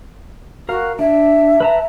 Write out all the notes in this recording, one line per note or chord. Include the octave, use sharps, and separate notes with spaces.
F#4 A#4 F5
D4 E5
B4 A5 A#5